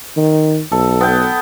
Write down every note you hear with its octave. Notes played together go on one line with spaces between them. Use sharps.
D#3
B1 A4
B3 G5